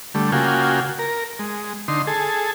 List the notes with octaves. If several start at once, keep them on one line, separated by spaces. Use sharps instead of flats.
D3 G3 A3
C#3 A#3 F4 F#4 G5 G#5
A#4
G#3
D3 D#4 C6
G#4 A4